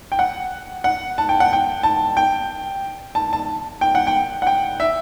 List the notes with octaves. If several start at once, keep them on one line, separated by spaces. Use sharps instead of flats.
G5
F#5
F#5
A5
G5
F#5
G5
A5
G5
A5
A5
G5
F#5
G5
F#5
G5
E5